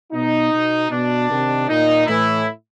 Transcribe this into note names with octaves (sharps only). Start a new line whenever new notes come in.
B2 D#4
B2
B2 D4
C3 D#3
A#2 D#4
A2 E3 E4